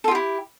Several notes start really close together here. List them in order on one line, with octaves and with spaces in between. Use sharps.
A4 F4 G4 E4